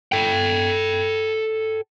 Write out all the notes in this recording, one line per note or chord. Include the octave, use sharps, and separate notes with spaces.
A4 G5